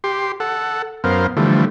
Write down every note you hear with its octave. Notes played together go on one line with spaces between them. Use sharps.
G4 C6
A4 F#5
F#2 B3 A#4 C5 F5
D3 E3 F3 G3 A3